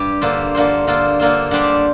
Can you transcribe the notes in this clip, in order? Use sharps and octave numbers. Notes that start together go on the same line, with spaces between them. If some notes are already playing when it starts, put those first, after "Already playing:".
Already playing: G2 G4
D3 A#3 F4 C5
D3 A#3 F4 C5
D3 A#3 F4 C5
D3 A#3 F4 C5
D3 G3 D4 G4 C5